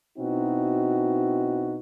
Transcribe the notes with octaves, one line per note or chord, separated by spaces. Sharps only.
B2 C4 D#4 E4 F#4